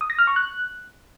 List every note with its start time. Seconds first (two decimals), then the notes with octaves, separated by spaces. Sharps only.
0.01 D#6
0.10 A#6
0.19 F6
0.27 C#6
0.36 F#6